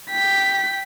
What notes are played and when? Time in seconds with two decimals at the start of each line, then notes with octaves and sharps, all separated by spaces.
0.10 G5 B6